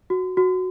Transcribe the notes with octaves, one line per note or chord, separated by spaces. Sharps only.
F#4
F#4